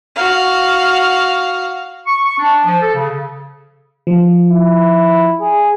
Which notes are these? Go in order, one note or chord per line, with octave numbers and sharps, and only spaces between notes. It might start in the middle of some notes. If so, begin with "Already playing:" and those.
F#4 F5
C#6
C#6
D4
F3
A4
C#3
F3
E4
G#4